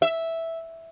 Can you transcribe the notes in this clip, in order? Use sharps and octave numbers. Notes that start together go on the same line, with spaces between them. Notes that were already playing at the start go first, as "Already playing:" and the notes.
E5